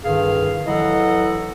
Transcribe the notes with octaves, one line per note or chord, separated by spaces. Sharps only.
C2 G2 D3 D#3 G#4 F5
E3 F#3 E4 A4 D#5 F#5